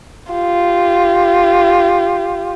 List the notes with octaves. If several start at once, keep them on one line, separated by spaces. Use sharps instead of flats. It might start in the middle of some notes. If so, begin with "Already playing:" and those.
F4 G4